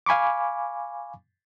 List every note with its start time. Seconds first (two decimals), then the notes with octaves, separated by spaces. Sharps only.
0.06 F5 G#5 B5 C#6 D6